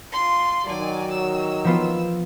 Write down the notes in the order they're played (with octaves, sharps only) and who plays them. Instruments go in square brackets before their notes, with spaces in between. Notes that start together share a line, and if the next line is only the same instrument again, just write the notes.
[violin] F4 C6
[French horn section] D#3 F#3 [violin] D5 G#5
[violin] E6
[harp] F3 B3 F4